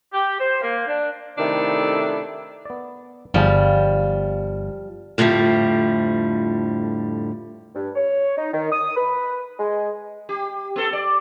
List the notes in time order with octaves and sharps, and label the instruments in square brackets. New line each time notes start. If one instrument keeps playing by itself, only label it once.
[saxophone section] G4
C5
A#3
D4
[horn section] C3 D#3 A3 D4 E4 A4
[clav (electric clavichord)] B3 D5
[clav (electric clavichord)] G1 G#4 A5 [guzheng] F3 G3
[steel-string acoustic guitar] F2 A2 D3 F3 G3
[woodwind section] G2
C#5
D#4
D#3
D#6
B4
G#3
[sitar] G4
B3 A4
D5